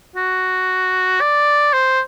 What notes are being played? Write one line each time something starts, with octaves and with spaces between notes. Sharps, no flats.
F#4
D5
C5